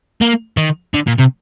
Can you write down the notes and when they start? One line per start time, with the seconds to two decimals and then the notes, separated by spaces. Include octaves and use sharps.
0.21 A#3
0.57 D#3
0.94 D3
1.07 A#2
1.18 C3